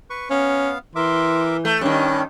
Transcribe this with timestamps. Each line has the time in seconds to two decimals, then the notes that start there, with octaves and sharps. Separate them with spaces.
0.10 B4 C#6
0.30 B3 C#4 F5
0.96 E3 A#4 E5 C6 D6
1.65 A3 G6
1.81 G2 D#3 C#4 D6 F#6